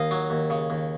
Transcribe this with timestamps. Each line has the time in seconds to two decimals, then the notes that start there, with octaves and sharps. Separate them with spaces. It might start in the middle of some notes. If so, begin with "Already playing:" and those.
Already playing: D#2 D#5 F5
0.11 F#3
0.30 D#2
0.50 C#3
0.70 D#2